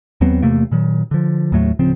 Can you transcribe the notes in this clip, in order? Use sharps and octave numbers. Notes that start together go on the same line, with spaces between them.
D#2 F#3 B3 C4
E2 C3 A3 A#3
A#2 D#3 F#3
D3 F3
D#2 A2 F#3 A3
D1 C#3 F3 C4